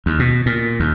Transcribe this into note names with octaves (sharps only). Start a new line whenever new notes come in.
D#2
B2
A#2
D#2